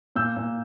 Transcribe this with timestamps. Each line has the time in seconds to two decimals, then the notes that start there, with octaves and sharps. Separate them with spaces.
0.15 A#2 E6 G6
0.36 A#2